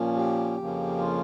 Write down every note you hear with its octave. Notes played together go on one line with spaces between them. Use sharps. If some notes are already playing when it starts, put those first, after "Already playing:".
Already playing: A#2 F3 A#3 C#4
G4
F2 C#3 F3 A#3 C#4
F4